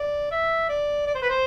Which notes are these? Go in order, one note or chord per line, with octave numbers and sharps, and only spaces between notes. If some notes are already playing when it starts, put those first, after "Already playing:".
Already playing: D5
E5
D5
D5
C5
B4
C5